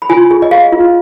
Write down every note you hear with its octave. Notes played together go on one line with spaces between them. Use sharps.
B5
F4 G#5
G#4
D#5
G#4 F5
F4